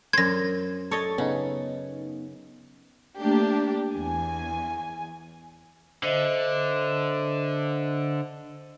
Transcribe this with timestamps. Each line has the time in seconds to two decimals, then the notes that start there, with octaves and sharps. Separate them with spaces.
0.13 F#2 C5 G#6 A#6
0.91 A4 C#5 D#5 C#6 A6
1.18 C#3 B3 D#4
3.19 A3 A#3 D4 G4
3.95 E2 G#5
6.03 D3 C5 D#5 E5